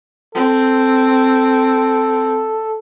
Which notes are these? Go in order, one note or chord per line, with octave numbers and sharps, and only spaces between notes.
C4 A4